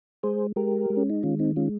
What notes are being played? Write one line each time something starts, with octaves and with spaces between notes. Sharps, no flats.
G#3 G#4 C5
G#3 G4 A#4
G#3
C#4
D#4
D#3 C#4 F4
C4 D#4
G#3 C#4 F4